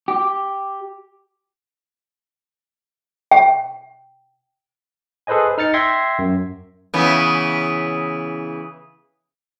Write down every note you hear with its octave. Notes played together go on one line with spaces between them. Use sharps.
G4
G5
G#4 A4 B4 C5 D#5 G#5
D#4 F6 A6 C#7
E5 G5 C6 G#6 A#6 C7
F#2
C#3 E3 B3